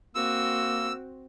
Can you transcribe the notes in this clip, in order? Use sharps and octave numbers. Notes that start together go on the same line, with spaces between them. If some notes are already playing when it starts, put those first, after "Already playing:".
A#3 C4 F#4 E6